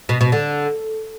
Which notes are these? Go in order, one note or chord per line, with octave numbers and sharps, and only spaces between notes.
B2
B2
D3